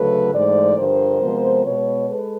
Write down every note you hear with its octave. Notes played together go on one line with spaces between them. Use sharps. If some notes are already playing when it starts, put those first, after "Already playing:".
Already playing: D2 C#3 F#3 A3 A4 B4
G#2 E3 A3 C5 D5
G2 D3 F3 A#4 C5
C3 F3 G#3 B3
B2 G#3 B3 B4 C#5
G#3 A4 B4